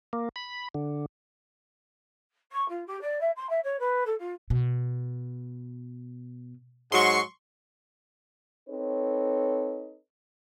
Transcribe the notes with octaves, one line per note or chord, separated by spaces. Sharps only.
A#3
B5
D3
C#6
F4
G4
D5
E5
C6
E5
C#5
B4
A4
F4
B2
G#2 F#3 G#3 C6 C#6
C4 D#4 A4 B4 C#5